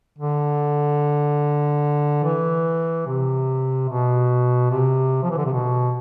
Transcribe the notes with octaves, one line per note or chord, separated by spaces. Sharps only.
D3
E3
C3
B2
C3
F3
E3
D3
C3
B2